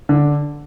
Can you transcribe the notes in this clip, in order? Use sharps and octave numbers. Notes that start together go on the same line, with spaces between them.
D3